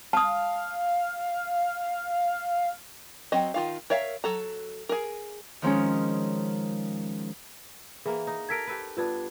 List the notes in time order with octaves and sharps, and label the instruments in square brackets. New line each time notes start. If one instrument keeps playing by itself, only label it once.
[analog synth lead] F5 [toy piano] A5 D#6
[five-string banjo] F#3 C4 D#5
D#3 F4 F5
A#4 C#5 E5 F5
F#3 A4 A#5
G#4 A#4
[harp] D#3 F3 G#3 C#4
[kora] E3 A#3 [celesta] G#4
[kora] D#4
[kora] G4 A4 A#4 [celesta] G#6 B6 D7
[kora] G4 A4 B4
[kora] G2 B3 D4 [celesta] F4 B4 G#6